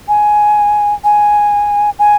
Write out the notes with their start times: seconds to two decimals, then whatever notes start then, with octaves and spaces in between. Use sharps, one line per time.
0.08 G#5
1.04 G#5
1.99 G#5